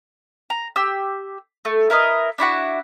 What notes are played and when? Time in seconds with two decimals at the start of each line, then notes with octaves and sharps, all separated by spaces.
0.50 A#5
0.76 G4 E6
1.65 A3
1.90 E4 A#4 B4 D#5
2.38 D4 E4 F#4 F#5